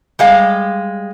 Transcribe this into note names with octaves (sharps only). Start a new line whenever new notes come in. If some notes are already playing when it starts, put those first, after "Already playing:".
G3 G#3 F5